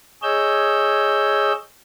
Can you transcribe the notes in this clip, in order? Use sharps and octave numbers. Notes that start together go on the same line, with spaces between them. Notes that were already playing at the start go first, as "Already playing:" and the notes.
G#4 C#5 D#5 E6 G6